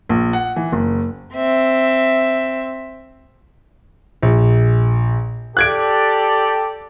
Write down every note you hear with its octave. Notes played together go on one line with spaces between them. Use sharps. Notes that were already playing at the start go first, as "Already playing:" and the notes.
A#1
F#5
E3
F#1
C4 E5
A#1
G4 A4 D5 F#6 G#6 D7